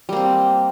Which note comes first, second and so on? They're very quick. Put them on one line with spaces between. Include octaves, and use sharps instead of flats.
G3 A#3 C4